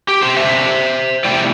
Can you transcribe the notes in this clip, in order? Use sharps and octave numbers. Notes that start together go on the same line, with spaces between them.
G4
G4 C5
C3 A3 D4 C5 E5
C3 A3 E4 D5 G5